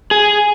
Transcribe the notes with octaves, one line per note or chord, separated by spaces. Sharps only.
G#4